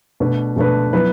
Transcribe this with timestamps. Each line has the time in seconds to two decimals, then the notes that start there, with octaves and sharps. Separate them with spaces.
0.20 B2 A3 D4 B4
0.56 B2 A3 D4 B4
0.93 F#3 B3 E4 B4